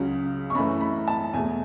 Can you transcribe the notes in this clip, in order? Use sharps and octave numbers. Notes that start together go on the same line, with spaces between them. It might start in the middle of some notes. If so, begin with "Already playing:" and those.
Already playing: C#2 C#3 F#3
C#6
F#2 E3 A3 B5
B5
A5
E2 B2 A3 G#5